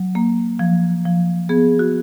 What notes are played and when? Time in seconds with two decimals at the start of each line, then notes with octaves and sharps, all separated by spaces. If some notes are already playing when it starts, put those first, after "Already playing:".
Already playing: F#3
0.15 A#3
0.59 F3
1.05 F3
1.49 B3 G#4
1.79 F#4